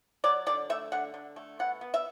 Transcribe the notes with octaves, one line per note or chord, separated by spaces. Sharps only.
F#3 D5
D3 D5
A3 E5
D3 F#5
D3
A3
B2 F#5
B3
E5